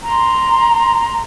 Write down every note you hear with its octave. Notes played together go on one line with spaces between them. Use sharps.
A#5 C6